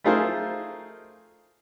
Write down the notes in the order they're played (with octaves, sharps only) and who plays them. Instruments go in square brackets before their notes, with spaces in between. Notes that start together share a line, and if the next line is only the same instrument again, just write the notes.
[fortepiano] A3 D#4 F4 G#4 A#4 C5